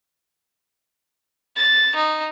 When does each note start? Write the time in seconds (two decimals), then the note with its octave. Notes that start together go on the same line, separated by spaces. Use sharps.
1.57 A6
1.96 D#4